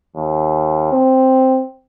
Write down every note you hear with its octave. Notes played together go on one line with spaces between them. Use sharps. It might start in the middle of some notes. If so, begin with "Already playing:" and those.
D#2
C4